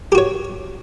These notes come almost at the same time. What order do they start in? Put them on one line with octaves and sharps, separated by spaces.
G4 F#4 C#5